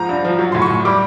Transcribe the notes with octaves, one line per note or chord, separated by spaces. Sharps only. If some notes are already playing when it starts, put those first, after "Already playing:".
Already playing: G#2 F3 A#5
G2
F3
F#3
A2 C6
C#6
A2
G3 D6